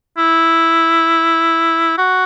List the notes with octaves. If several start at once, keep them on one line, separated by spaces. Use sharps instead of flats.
E4
F#4